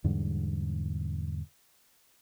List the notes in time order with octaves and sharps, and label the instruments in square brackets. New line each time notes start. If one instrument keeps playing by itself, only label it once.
[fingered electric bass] E2 G#2 D3 G3